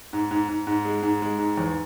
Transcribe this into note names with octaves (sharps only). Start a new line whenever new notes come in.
G#2
G#2
G#2
G#2
G#3
G#2
G#3
G#2
E2